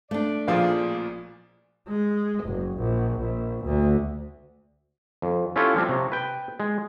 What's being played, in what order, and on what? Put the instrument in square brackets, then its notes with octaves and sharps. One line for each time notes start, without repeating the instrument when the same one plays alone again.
[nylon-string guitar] A3 D4 [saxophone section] D5
[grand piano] A1 A#2 F3 [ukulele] F4 G#4 F5
[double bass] G#3
F#1
A#1
A#1
D2
[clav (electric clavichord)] F2
C#4 E4 F4 G4 A4 C#5
F3 G3 C4 D4
C3 C#5 A#5
B4 G5
G#3